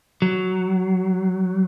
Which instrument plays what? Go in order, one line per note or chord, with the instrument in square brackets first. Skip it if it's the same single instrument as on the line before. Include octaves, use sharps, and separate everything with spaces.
[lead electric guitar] F#3